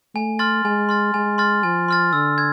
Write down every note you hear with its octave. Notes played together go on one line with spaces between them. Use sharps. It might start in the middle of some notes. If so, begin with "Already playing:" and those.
A3 G#5
C6 F6 A6
G#3 G#5
C6 F6 A6
G#3 G#5
C6 F6 A6
F3 G#5
C6 F6 A6
D3 E6
G#6